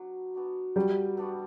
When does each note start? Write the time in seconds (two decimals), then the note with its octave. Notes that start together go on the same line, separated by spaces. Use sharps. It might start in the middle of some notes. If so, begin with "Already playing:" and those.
Already playing: F#3 B3 D4 F#4
0.34 B3 D4 F#4
0.76 F#3 G3
1.17 B3 D4 F#4